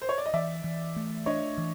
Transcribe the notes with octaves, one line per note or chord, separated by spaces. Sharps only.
C5
C#5
D5
D#5
E3 D5 E5
E3
A3
D4 C#5 D#5
E3